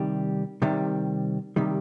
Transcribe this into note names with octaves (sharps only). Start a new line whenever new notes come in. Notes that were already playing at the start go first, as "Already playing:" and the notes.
Already playing: C3 D#3 G3
C3 D#3 G3
C3 D#3 G3